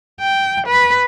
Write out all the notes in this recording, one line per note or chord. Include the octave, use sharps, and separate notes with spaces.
G5
B4